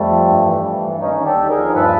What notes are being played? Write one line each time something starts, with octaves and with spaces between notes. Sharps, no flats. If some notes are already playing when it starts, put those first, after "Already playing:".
Already playing: F2 G3 A3
F3
G2
E3
E3
G2
D#2 C#4 D#4
D3
G4 A4
D#2
G#4 A#4
F3
G2 A4 B4